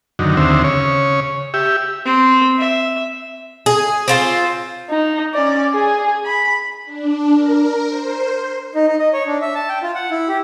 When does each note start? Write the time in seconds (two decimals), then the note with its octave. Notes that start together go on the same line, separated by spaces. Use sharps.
0.19 F#2 D3 D#3
0.37 D#2 D3 C4 E5
0.64 C#3 C#5
1.54 G4 E5
2.05 C4
2.58 E5
3.66 G#4
4.08 C4 F4 C5
4.90 D#4
5.34 C#4 D5
5.73 G#4 G#5
6.26 B5
6.85 D4
7.33 A#4
7.88 C5
8.75 D#4
8.87 D#4
8.99 D#5
9.13 C#5
9.27 D4
9.42 E5
9.55 A5
9.69 G5
9.83 F4
9.95 F#5
10.11 E4
10.28 G4